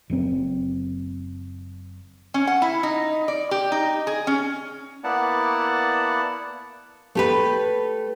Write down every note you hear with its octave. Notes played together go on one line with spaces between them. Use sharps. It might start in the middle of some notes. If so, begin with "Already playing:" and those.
F#1 F#2 C4
C#4
F#5
E4
D#4
D5
G4
D#4
G#4
C#4
A#3 B3 E4 D5 F#5 A5
A3 G4 B4